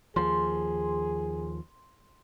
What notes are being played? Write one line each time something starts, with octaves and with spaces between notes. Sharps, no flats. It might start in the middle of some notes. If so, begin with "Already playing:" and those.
D#2 F3 G#4 C6